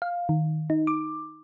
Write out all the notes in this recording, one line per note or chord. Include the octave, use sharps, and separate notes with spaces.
F5
D#3
D#4
D6